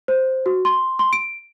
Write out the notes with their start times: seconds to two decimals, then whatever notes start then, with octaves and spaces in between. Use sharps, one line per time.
0.08 C5
0.46 F#4
0.65 C6
0.99 C6
1.13 D7